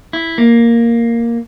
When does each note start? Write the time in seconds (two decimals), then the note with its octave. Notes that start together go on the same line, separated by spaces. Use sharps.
0.13 E4
0.38 A#3